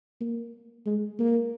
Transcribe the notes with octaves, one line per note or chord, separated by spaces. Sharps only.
A#3
G#3
A#3